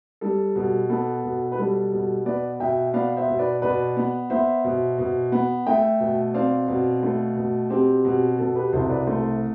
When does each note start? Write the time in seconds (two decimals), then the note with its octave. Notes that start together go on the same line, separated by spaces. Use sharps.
0.21 G3 A4
0.56 B2
0.90 B3 A4
1.24 B2
1.52 B4
1.58 G3 A4
1.92 B2
2.26 B3 B4 D5
2.60 B2 E5 G5
2.93 B3 D5 F5
3.17 C5 E5
3.28 B2
3.39 B4 D5
3.62 B2 B4 D5
3.97 B3
4.30 B3 C5 E5
4.64 B2
4.98 B2
5.32 B3
5.67 A3 E5 G5
6.00 B2
6.34 C4 D5 F5
6.68 B2
7.03 A3
7.36 B2
7.70 C4 G4
8.05 B2
8.39 B2 A4
8.56 G4 B4
8.73 C2 A4 C5
8.90 B4 D5
9.06 A3 A4 C5